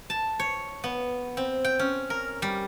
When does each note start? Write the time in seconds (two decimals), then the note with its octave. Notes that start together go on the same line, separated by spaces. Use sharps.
0.10 A5
0.40 C#5
0.84 B3
1.37 C4
1.64 G5
1.79 C#4
2.10 A#4
2.42 G3